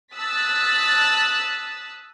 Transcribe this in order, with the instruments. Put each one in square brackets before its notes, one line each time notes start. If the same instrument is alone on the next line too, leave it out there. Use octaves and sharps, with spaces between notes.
[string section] A5 D#6 E6 F#6 A6 B6